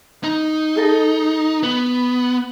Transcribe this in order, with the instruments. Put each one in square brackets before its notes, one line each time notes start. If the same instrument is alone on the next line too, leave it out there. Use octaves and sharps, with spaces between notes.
[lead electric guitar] D#4
[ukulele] G#4 A4 D#5
[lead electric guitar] B3